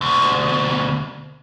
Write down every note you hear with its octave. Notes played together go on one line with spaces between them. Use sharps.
D2 B2